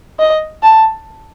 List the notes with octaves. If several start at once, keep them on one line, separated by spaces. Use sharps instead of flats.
D#5
A5